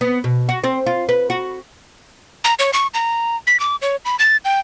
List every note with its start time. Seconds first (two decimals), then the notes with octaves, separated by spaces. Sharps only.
0.01 B3
0.24 B2
0.49 F#4
0.64 C4
0.86 F4
1.09 B4
1.30 F#4
2.44 A#5
2.59 C#5
2.73 C#6
2.94 A#5
3.47 B6
3.60 D6
3.82 C#5
4.05 B5
4.19 A6
4.45 G5